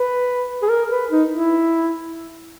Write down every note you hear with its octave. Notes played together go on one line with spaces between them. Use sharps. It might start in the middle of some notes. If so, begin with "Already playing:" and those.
Already playing: B4
G#4
A#4
B4
D#4
E4